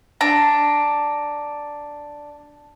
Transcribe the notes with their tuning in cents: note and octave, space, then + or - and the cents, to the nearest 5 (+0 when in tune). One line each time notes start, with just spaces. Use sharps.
D4 +0 A#5 +0